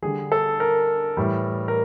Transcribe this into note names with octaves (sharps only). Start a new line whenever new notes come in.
D3 G3 G#4
A4
A#4
A2 E3 G3
A#4